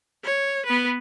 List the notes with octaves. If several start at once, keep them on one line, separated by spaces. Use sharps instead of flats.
C#5
B3 B4